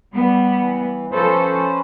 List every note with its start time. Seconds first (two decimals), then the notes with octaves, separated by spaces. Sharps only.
0.13 G3 B3
0.57 E3
1.11 F3 C#4 A4 B4 C5